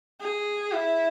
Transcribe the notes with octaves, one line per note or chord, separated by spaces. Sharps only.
G#4
E4